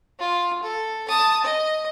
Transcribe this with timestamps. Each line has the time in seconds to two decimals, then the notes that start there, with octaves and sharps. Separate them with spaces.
0.19 F4
0.63 A4
1.09 A5 D#6
1.44 D#5